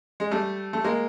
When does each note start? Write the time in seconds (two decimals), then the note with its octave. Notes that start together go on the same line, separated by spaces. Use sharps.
0.20 G#3
0.31 G3 A3
0.73 A3
0.84 G#3 A#3